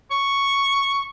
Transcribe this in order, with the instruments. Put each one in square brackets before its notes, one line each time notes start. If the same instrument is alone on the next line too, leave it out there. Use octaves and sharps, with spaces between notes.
[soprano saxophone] C#6